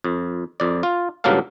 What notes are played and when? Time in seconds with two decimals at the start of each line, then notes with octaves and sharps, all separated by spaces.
0.04 F2
0.60 F2 D5
0.83 F4
1.24 C#2 G2 F#3 A#3 A4 F5